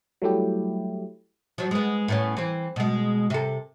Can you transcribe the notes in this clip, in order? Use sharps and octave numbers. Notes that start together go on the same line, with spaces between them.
F#3 G3 A3 E4 G4
F3 F#3
G#3 B3
A2 B3 C#4
E3 C4
B2 G#3
C3 A4